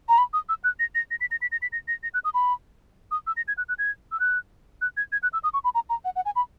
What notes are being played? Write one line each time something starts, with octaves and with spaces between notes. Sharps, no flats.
A#5
B5
D#6
E6
F#6
A#6
A#6
A#6
B6
A#6
B6
A#6
B6
A#6
A#6
A#6
F#6
D#6
B5
D#6
E6
A#6
G#6
F#6
F#6
G#6
E6
F#6
F#6
G#6
G#6
F#6
E6
D#6
C#6
B5
A#5
A#5
F#5
F#5
G#5
B5